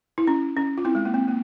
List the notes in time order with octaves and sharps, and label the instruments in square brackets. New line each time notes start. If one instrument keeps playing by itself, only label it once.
[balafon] E4
C#4
C#4
F4
C4 E4
G#3
A#3
C4
A#3